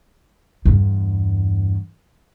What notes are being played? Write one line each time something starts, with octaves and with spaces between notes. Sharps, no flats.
E2 G2